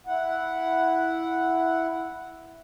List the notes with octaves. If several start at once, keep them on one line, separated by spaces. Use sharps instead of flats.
E4 F#5